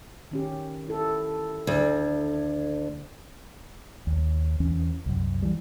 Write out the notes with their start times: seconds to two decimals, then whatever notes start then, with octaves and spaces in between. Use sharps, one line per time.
0.31 D#3 C#4 G4
0.88 E4 A4
1.67 D2
4.07 D#2
4.60 E2 E3 C#4
5.06 C2 F#2
5.42 E3 G3